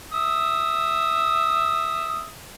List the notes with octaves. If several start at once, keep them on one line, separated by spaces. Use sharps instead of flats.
E5 D#6